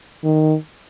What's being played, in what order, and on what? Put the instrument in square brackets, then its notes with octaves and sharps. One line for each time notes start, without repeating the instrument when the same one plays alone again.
[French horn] D#3